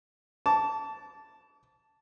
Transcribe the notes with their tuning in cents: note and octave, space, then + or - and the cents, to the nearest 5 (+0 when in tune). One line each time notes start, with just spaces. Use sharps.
A5 +0 D6 -40